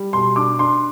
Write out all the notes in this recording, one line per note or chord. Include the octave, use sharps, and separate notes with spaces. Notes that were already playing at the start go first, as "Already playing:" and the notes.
Already playing: G3
B2 C6
D4 D6
D4 C6